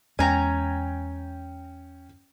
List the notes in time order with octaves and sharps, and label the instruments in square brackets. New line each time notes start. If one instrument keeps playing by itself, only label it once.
[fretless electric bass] E2 G#3 [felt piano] C#4 G5 [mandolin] G#5 A#5